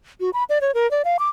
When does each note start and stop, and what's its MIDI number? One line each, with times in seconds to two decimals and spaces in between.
0.20 0.30 66
0.33 0.44 83
0.49 0.59 74
0.61 0.71 73
0.74 0.89 70
0.91 1.02 74
1.05 1.17 77
1.19 1.29 86